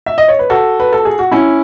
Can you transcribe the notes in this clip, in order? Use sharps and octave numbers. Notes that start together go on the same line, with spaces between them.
E5
D#5
C#5
B4
F#4 A4
B4
A4
G#4
F#4
C#4 E4